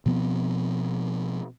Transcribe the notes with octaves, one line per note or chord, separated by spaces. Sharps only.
B2 F3 B3 C4